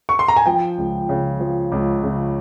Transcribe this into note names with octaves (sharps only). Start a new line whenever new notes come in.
C#6
C6
A#5
G#5
F3 G5
C#2
C#3
F3
C#2
C#3